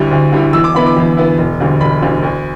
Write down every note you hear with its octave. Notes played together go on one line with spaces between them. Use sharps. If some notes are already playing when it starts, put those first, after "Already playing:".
Already playing: D2 D3 G3 E4
D2
D3 G3 E4
E2 E6
D6
D3 B3 E4 B5
D6
E2
D3 B3 E4
E1
D2 D3 G3
E1 B5
D2 D3 G3
D2